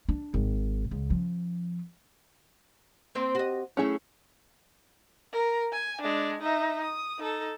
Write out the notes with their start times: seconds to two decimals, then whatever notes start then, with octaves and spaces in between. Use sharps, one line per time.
0.09 D4
0.34 G#1
0.91 C#2
1.10 F3 C#4
3.15 A#3 C4 C5
3.35 F#4 G4 D#5
3.77 F#3 A3 C#4 E4 G#4
5.32 A#4
5.72 G#5
6.01 G#3 D4
6.41 D#4 E5
6.82 D#6
7.19 D#4 A4